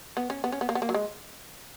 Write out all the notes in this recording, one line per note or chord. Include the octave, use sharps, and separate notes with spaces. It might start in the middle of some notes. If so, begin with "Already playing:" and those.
B3
C#4
B3
C#4
B3
A#3
B3
A#3
F#3
G#3